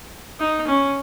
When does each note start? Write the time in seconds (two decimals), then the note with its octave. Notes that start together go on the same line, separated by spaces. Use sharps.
0.40 D#4
0.68 C#4